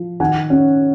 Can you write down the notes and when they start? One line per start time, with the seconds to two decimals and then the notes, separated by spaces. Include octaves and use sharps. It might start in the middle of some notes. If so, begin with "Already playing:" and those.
Already playing: F3
0.20 D#3 F#5 G#5
0.50 C#4